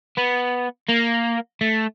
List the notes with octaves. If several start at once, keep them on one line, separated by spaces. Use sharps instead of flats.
B3
A#3
A3